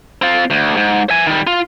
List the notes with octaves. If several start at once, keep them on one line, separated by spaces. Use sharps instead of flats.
C4 F4
D2
G#2
E5 G#5
D#3 G3
F4